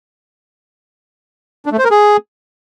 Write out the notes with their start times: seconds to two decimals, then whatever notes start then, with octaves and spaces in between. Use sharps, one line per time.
1.66 D4
1.72 A3
1.78 C5
1.85 A#4
1.91 G#4